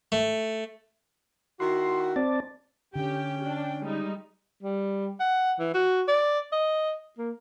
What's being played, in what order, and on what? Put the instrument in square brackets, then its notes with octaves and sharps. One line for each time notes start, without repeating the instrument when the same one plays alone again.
[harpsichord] A3
[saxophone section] D#3 E4 F#4 [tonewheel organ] C6
[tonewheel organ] C4 D5 A5
[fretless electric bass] D3 [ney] C#4 [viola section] G4 [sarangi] G5
[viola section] D4
G3 G#3 D#4
[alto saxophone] G3
F#5
E3
F#4
D5
D#5
A#3